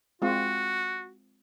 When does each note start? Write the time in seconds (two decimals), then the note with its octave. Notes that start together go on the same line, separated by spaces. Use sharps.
0.22 G#3 C4 F4 F#4